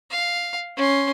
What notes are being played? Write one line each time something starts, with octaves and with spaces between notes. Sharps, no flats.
F5
C#4 C6